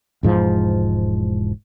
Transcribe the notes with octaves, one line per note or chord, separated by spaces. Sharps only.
E1 G#2 F3